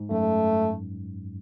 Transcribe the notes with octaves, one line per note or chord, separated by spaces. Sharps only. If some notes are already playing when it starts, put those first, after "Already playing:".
Already playing: G#2
F#2 A3